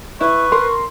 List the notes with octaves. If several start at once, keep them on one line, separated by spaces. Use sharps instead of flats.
E4 B4 C#6
A#4 C6